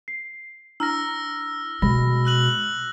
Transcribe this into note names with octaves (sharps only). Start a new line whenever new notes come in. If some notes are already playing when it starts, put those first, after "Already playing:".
C7
D4 E4 A#5 E6 F6 A#6
B2 G#3 B5 A#6
E6 F#6 F#7